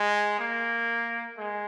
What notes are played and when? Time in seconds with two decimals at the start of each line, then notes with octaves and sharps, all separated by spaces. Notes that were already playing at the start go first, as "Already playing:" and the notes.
Already playing: G#3
0.39 A#3
1.38 G#3